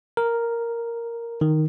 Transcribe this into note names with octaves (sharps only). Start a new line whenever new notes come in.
A#4
D#3